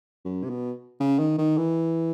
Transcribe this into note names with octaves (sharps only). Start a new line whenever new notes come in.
F#2
C3
B2
C#3
D#3
D#3
E3